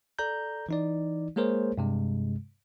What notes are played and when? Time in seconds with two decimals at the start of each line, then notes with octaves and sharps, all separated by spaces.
0.19 A4 D5 A#5 G6
0.69 E3 D#4 D5
1.36 G#3 A#3 G#4 A#4 C5 C#5
1.78 G2 C3 G#3